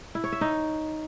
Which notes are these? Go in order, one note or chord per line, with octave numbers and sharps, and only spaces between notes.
E4
C#5
E5
D#4